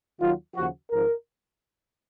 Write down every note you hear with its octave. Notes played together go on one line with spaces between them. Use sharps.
D#2 D#3 F#3 F4
D#2 C#3 F3 F#4
G#1 G#2 F3 A#4